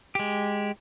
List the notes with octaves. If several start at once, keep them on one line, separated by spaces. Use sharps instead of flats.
G#3 G4